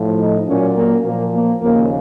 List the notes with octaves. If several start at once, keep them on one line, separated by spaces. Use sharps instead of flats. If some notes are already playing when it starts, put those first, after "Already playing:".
Already playing: A2 F3
D#4
A#2 F#3 C#4
A#3
A#2 F3 A#3
A#3
D#2 C#3 F3 A#3